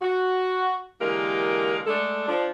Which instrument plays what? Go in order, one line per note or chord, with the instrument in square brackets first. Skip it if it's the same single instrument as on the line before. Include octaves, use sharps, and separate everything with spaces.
[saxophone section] F#4
D3 E3 G#3 A#3 G4 A#4
G#3 A3 D4 A4
F3 D4